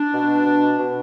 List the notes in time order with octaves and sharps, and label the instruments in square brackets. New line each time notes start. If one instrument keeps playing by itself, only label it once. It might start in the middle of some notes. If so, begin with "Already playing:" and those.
Already playing: [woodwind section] D4
B2
B2
B2